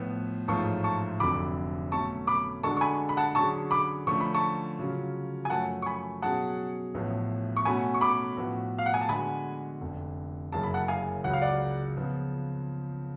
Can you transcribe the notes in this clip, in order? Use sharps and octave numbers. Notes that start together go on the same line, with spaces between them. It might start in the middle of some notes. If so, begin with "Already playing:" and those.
Already playing: A2 F3 B3 F4 B4
A1 G#2 F3 A3 F4 A5 C#6
A5 C#6
F1 F2 D3 F#3 B5 D6
B2 F#3 A3 C#4 A5 C#6
B5 D6
D3 G#3 D4 F#4 A4 A5 C#6
C#6
G#5 B5
B5
F#5 A5
D3 F#3 C#4 G#4 A5 C#6
B5 D6
D3 F3 A3 C#4 C#6
B5
A5 C#6
C#3 F#3 C#4 F4
G#5
F#2 F3 A3 C#4 F#4 F#5 A5
C#6
G#5 B5
B2 F#3 C#4 G#4 F#5 A5
A1 A2 F3 B3
C#6
B2 A3 C#4 F#4 G#5 B5
C#6
B5 D6
A2 F3 B3 F#4
F5
F#5
G#5
A5
D3 G#3 B3 F#4 G#5 B5
F1 F2 D3
F#1 F#2 C#3 A5
B5
F#5 A5
F5 G#5
C#2 C#3 F#3 F#5
F5
D5 F#5
C#3 F3 B3 F4